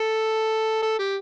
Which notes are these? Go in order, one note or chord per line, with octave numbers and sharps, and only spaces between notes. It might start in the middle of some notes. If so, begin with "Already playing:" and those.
Already playing: A4
A4
G4